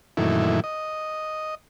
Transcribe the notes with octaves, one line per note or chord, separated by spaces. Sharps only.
F#2 A#2 D#3 E3 A3 E4
D#5